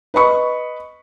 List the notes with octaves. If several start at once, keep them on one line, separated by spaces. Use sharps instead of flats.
B4 D#5 B5 C#6